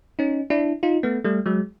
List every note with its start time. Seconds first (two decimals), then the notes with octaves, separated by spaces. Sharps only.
0.19 C#4 D#4
0.50 D4 E4
0.83 D#4 F4
1.03 A3 B3
1.24 G3 A3
1.46 F#3 G#3